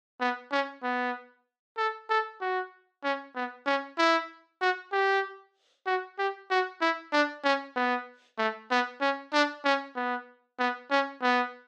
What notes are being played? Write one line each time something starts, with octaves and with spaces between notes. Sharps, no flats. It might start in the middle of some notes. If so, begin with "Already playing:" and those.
B3
C#4
B3
A4
A4
F#4
C#4
B3
C#4
E4
F#4
G4
F#4
G4
F#4
E4
D4
C#4
B3
A3
B3
C#4
D4
C#4
B3
B3
C#4
B3